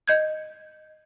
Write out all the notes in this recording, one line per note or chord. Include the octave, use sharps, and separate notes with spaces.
D#5 G6 G#6